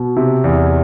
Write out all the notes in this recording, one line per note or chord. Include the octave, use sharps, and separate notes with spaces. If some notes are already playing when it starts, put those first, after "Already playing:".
Already playing: B2
C3
E2